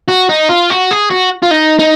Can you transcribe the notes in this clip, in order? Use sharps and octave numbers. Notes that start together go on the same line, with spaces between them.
F#4
D#4
F4
F#4
G#4
F#4
F4
D#4
D#4